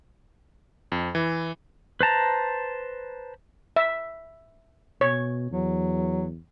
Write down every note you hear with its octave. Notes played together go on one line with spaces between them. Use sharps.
F2
E3
B4 C5 A5 A#5
E5
B2 C#5
E2 F#3